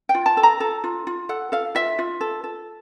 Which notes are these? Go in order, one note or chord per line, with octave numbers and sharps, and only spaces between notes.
G5
F4
A5
A4
A#5
A4
F4
F4
A4 F#5
A4 F5
F4 E5
F4
A4
A4